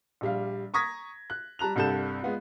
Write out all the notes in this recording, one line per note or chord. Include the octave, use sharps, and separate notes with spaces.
A#1 G3 F5
A#5 C#6 D#6 G#6 A#6 B6
F#6
G3 A5 A#5 F#6 F7
C2 G2 A4 G6 E7
G#3 B3 F4